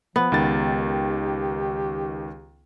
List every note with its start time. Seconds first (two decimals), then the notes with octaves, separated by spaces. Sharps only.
0.16 F3 B3
0.32 C#2 D#3 G4 A6